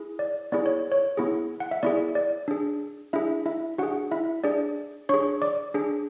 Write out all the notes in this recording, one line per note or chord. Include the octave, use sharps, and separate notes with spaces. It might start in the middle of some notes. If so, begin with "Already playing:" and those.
Already playing: E4 G#4
D5
B3 E4 G#4 D5
C#5
C#5
B3 E4 G#4
F#5
E5
B3 E4 G#4 D5
D5
D4 G#4
D4 E4 G#4 E5
E4 E5
D4 F#4 G#4 F#5
E4 E5
D4 G#4 D5
D4 G#4 C#5 C#6
D5 D6
D4 G#4